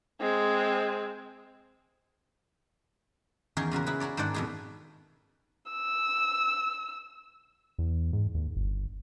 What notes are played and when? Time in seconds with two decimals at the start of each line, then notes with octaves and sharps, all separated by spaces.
0.21 G#3 C4
3.57 E2 D#3 C#4 G#4 A#4 C#5
3.71 A#2 C#3 F#4 A#4
3.86 E4 G#4 B4
4.00 F#4 A#4 C#5 D5
4.17 G#2 D#3 D4 D5 F#5
4.34 F2 B2 G#4
5.72 E6
7.78 E2
8.13 G#2
8.34 D#2
8.56 G1